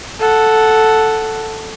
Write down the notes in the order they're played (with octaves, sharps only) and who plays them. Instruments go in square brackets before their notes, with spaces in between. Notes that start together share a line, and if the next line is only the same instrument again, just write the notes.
[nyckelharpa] A4 F#5